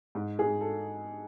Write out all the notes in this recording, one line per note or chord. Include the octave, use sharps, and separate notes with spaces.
G#2
G#4
G#2
A4